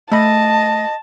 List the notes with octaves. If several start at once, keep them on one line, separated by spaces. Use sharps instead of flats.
A3 D#5 A5 B5